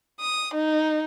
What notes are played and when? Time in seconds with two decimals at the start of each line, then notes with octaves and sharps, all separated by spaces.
0.21 D#6
0.54 D#4